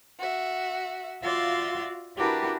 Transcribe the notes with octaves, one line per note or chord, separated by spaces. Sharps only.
F#4 E5
F4 F#4 D5 E5 F5 C6
D4 E4 F#4 G4 A#4 B4